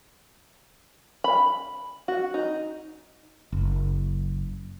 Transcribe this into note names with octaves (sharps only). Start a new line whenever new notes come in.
B5
F#4
D#4
F#1